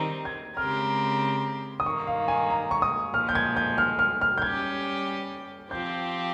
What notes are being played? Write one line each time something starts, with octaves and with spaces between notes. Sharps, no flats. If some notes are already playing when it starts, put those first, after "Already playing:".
Already playing: D#3 G3 C4 D#4 A#5
G#6
C#3 G#3 C4 G4 A#4 F6
D#6
G2 D#3 A#3 C#6
F5
G#5
A#5
C#6
D#6
A#2 F3 G#3 F6
G6
G#6
G6
F6
F6
F6
G6
G3 C#4 G4 G#6
F3 C4 G4 G6